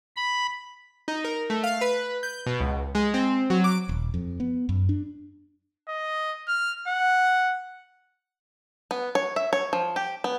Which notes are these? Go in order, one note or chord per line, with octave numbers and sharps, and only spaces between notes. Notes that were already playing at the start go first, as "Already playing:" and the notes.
B5
D#4
A#4
A3
F5
B4
G6
B2
C#2
G#3
C4
F#3
D6
D#1
F2
B3
F#2
D4
D#5
F6
F#5
B3
C#5
E5
C#5
F3
G4
B3